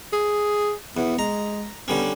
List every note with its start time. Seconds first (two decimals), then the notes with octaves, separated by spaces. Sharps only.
0.13 G#4
0.97 E2 B3
1.19 G#3 A#5
1.88 D3 G3 B3 C#4